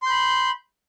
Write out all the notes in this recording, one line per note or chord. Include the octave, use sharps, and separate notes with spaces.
B5 C6 G6